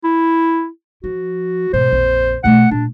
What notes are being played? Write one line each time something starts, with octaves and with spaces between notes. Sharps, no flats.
E4
F3 F#4
G#2 B2 C5
A#1 F2
B2 A3 F#5
A#2 D4